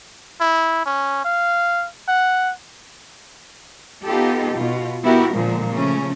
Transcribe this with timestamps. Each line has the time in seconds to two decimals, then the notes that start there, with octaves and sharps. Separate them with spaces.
0.41 E4
0.86 C#4
1.25 F5
2.08 F#5
4.04 B3 D#4 F4 G4 A4
4.54 B2 F4
5.04 B3 E4 F#4 G4 A#4
5.34 A#2 D3 F3 G#3
5.71 C#3 F3 A3 C#4